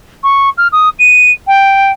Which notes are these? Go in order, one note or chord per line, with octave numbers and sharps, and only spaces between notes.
C#6
F6
D#6
D#7
G5